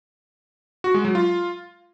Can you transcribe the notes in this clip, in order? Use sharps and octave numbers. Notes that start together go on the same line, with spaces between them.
F#4
G#3
F#3
F4